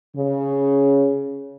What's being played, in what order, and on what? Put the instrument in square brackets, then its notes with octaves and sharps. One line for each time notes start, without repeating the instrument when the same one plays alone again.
[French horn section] C#3